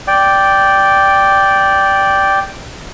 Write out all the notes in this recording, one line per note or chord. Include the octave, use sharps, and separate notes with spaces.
D5 G5